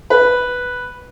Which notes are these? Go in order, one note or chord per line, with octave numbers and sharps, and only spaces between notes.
B4